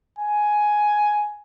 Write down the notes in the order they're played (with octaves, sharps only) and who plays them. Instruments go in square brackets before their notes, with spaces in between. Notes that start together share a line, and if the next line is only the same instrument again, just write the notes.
[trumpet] G#5